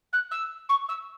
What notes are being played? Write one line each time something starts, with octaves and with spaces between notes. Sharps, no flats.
F#6
E6
C#6
E6